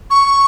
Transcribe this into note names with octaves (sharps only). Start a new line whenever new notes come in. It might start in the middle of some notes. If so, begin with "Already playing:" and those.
C#6